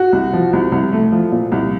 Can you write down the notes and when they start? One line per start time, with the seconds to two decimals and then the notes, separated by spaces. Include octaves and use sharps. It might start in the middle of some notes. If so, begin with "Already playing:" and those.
Already playing: F#4
0.13 C2
0.33 F3
0.53 C2
0.72 C2
0.92 A3
1.12 F3
1.32 A#2
1.52 C2